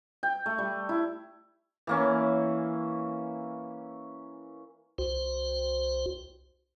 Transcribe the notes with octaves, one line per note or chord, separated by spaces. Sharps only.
G5
A3
G3
E4
E3 A#3 C#4
C2 F#4 C5